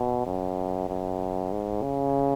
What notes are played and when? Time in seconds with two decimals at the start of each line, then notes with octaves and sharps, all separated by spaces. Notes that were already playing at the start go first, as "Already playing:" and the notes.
Already playing: B2
0.26 F#2
0.89 F#2
1.52 G#2
1.82 C#3